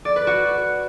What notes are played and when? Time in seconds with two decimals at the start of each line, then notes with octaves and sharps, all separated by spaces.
0.05 D5
0.16 B4
0.27 F#4